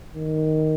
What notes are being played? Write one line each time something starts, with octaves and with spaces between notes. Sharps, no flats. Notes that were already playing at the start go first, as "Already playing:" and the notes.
D#3